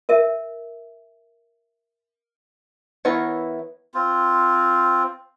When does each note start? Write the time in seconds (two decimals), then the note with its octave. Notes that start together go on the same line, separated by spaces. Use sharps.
0.09 A#4 E5
3.05 E3 B3 E4 A#4 C#5
3.94 C4 F4